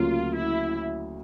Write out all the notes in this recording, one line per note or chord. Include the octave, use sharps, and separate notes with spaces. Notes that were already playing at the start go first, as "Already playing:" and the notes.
Already playing: D2 C#3 F#3 A#3 C#4 F4
E4